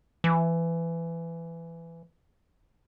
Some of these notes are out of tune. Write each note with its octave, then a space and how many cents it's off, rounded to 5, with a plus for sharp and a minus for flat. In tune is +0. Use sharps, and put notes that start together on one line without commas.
E3 +20